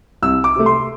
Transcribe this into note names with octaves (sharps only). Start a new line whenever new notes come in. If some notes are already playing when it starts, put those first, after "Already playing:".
C2 E6
D6
C3 A3
C6